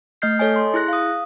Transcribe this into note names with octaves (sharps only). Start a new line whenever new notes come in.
A3 D#5 F6 G6 C7
A4 C#5 D#5 G#5
C6
E4 G#4 F#6 A#6
F5 D#6